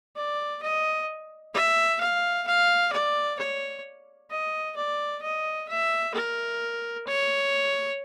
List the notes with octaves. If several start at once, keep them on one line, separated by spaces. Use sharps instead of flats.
D5
D#5
E5
F5
F5
D5
C#5
D#5
D5
D#5
E5
A#4
C#5